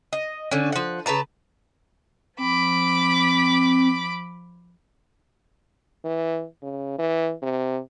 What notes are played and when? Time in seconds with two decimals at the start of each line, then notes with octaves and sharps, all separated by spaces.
0.13 D#5
0.51 D3 C#4
0.72 F3 F#5
1.06 C#3 B4 A5 A#5
2.38 F3 C4 B5 D6
6.05 E3
6.63 C#3
6.99 E3
7.42 C3